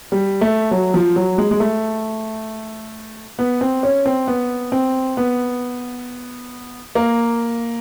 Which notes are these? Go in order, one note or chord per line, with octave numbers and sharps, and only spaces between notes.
G3
A3
F#3
F3
F#3
G#3
G#3
A3
B3
C4
C#4
C4
B3
C4
B3
A#3